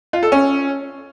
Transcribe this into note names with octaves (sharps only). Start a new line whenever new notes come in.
F4
A4
C#4